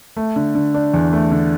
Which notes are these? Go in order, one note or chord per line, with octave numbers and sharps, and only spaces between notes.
A3
D3
D3
D4
E2
A3
D3